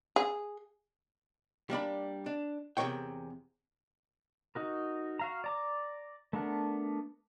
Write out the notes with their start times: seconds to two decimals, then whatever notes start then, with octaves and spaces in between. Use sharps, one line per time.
0.16 G#4
1.70 G3 A#3 D4 B5
2.26 D4
2.77 E2 C3 E3 A#4 C#5 G5
4.55 D#4 F#4 A#4
5.19 F#4 F5 A#5
5.44 D5 A#5 D6
6.33 A3 B3 D4 A#4 F#5